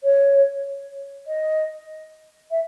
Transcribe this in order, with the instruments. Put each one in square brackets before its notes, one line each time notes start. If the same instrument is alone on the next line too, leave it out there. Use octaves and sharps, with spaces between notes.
[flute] C#5
D#5
E5